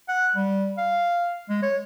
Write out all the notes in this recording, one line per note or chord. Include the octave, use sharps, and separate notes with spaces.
F#5
G3
F5
G#3
C#5